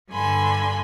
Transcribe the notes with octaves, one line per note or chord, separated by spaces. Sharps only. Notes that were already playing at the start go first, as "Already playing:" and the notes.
G2 D3 G#5 B5 C6